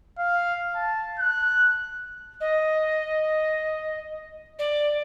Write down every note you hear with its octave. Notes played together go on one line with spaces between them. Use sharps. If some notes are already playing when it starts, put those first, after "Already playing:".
F5
A5
F#6
D#5
D5